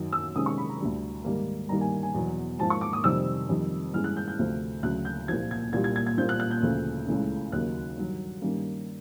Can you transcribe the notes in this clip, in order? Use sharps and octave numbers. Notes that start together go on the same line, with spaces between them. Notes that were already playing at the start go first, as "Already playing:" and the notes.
Already playing: F#2 D#3 F#3
E6
C3 D#3 G#3 C#4 D#6
C#6
B5
A#5
D2 D3 G3
G#2 D#3 G3 A#3
G2 D#3 G3 A#3 A#5
G#5
G#5
E2 B2 F#3
G#2 F3 A#3 A5
C#6
D6
D#6
F2 C3 D#3 G3 C4 E6
F2 C3 D#3 G3
G2 E3 G#3 C#4 F6
F#6
G6
G6
D2 C3 F3 A3 C4
D2 C#3 F#3 F#6
G6
C2 A#2 F3 G#6
G#6
C2 A#2 G3 G#6
G#6
G#6
G#6
A#2 G3 C4 G6
F#6
F#6
G6
D2 C#3 F3 A3
C#2 C#3 E3 A3 C#4
D#2 C#3 F#3 A#3 D#4 F#6
G2 D#3 F#3
G2 D#3 G3 A#3 C#4